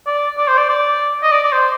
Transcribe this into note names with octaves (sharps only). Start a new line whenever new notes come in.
D5
D5
C5
D5
D5
D#5
D5
D5
C5